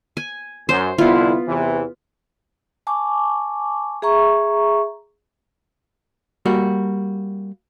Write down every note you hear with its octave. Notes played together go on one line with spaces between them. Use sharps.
G#5
F#2 C5
C2 D3 B3 E4 F4
E2 C3 E3
G#5 A5 C#6 D6
G#4 E5 A#5 C#6
G3 A#3 F#4